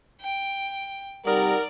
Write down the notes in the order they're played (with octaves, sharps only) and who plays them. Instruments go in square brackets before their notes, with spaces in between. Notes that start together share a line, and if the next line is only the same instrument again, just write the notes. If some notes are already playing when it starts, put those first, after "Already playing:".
[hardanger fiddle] G5
[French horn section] C3 G3 [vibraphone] D#4 F#5 [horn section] A#4 [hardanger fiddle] D5